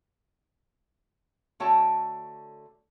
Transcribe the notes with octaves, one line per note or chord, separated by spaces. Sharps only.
D3 A3 F#4 C#5 G5 A5